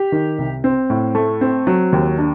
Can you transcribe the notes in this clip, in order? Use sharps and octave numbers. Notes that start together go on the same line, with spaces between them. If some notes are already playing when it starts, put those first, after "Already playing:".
Already playing: G4
D#3
C2
C4
A2
A3
C4
F#3
D#2
D4